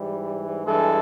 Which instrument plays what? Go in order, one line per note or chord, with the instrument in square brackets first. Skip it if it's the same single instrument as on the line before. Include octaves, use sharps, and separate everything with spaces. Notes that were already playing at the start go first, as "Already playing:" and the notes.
Already playing: [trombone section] G#2 E3 G3
G2 E3 G#3 A4